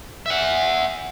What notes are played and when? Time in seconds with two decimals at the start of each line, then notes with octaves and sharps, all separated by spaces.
0.26 E5 F#5